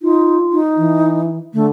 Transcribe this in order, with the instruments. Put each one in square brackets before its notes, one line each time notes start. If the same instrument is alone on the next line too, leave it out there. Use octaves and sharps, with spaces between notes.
[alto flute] D#4 [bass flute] F4
[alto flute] D#4
[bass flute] E3
[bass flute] D3 [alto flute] A3